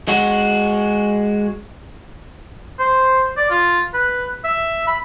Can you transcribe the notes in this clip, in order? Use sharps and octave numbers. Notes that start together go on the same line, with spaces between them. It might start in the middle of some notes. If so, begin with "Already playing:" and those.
G#3 F#4
C5
D5
F4
B4
E5
B5